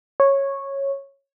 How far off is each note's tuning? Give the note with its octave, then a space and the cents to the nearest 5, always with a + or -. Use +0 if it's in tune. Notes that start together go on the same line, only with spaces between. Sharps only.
C#5 -10